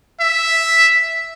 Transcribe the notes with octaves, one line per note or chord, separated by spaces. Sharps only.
E5